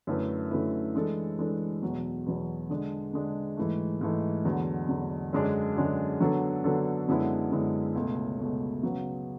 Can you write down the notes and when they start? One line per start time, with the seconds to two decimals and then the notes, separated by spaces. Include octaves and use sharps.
0.07 F#2 D3 A3 E4 B4
0.51 F#2 D3 A3 E4 B4
0.94 E3 G#3 D4 A4
1.38 E3 G#3 D4 A4
1.82 E2 B2 F#3
2.26 E2 B2 F#3
2.70 D3 G#3 D4
3.13 D3 G#3 D4
3.57 G#2 E3 A3
4.01 G#2 E3 A3
4.45 E2 D3 F#3
4.89 E2 D3 F#3
5.33 F#2 D3 G#3 D4 G#4
5.76 F#2 D3 G#3 D4 G#4
6.20 D3 F#3 B3 D4 A4
6.64 D3 F#3 B3 D4 A4
7.08 F#2 D3 G#3 B3 E4
7.52 F#2 D3 G#3 B3 E4
7.95 C#2 B2 A3
8.39 C#2 B2 A3
8.83 C#3 F#3 B3